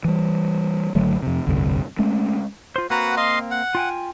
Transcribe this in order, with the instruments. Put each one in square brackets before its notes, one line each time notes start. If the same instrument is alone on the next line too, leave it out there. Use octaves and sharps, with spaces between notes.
[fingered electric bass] E3 G3
G#1 D3 F#3 A3
F2 C3
F1 C2 G2 D3
G#3 A3 C#4
[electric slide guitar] F4 C5
[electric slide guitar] A#3 C4 A#5 [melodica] F#4 B4 F#5
[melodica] D#5 F5 C6
F#5
[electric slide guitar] F4 G5 G#5